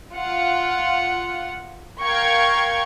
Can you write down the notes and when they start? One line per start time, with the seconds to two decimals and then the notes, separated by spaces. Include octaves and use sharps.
0.15 F4 F#5
2.02 A#4 F5 G5 C#6 G#6